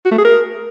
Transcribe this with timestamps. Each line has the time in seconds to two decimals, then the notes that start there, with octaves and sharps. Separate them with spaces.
0.05 F#4
0.12 A3
0.18 G#4
0.24 A#4